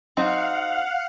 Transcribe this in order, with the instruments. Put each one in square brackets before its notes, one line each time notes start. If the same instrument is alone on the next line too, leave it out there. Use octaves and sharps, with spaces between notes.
[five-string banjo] F#3 C4 D#4 [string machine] F5 F#5